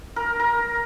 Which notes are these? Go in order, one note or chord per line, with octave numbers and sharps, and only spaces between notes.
A#4
A#4